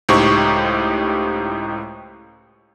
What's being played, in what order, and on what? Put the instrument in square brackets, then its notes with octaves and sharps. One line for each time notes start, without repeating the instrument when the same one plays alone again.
[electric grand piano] C#2 A2 D#4 G4 C5 C#6